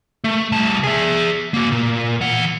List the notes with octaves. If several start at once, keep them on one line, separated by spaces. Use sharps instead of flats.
A3
C2 A5
G#4 E5
A#3 F#4
A#2
E3 F#5